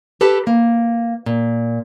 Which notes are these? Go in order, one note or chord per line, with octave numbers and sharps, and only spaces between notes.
G4 A4 B4 A5
A#3
A#2